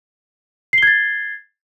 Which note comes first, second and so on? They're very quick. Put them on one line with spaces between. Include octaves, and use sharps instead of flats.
C7 G7 G#6 A6